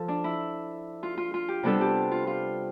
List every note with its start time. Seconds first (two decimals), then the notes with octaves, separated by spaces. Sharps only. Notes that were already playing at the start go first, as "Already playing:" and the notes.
Already playing: F3 A4
0.08 D4
0.24 E4
1.03 F4
1.18 F4
1.34 F4
1.49 G4
1.63 C3 G3 B3 D4 A4
1.81 G4
2.11 F4
2.27 F4